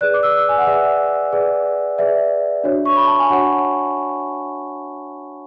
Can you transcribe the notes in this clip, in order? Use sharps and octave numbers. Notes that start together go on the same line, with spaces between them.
G#4 B4 D5 F#6
D6
E6
G#5
F#5
G#4 B4 D5 E5
G#4 B4 D5
G#4 B4 D5 E5
D4 F#4 C#5
C#6
B5
A5
G#5
D4 F#4 C#5 F#5